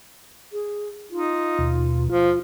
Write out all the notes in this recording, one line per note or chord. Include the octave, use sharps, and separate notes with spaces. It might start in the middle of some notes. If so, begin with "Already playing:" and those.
G#4
D#4 F4
D#2 B2
F3 F4